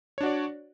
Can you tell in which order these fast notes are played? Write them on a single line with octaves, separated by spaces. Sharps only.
C#5 D4 F#4 D5